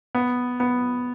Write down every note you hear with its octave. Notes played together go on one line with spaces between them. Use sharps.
B3
B3